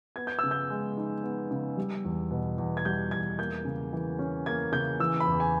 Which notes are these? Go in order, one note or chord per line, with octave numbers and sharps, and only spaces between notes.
B3 G#6
G6
C#3 E6
G6
G#3
D#4
B3
C#3
G3
E2
B2
E2
G#6
G3 G6
E2 G#6
A#3 G6
C#3
E3
C#4
A#3 G#6
C#3 G6
E3 E6
B5
E2
G#5